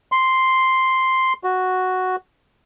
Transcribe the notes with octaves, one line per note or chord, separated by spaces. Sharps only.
C6
F#4